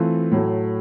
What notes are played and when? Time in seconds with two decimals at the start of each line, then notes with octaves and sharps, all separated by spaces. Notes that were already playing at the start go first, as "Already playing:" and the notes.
Already playing: E3 A3 C4 F4
0.32 A2 F#3 A3